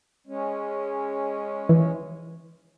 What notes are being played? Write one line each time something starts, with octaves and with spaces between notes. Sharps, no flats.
G#3 C#4
E3